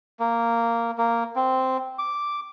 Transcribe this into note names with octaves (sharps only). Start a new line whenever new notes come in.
A#3
A#3
C4
D6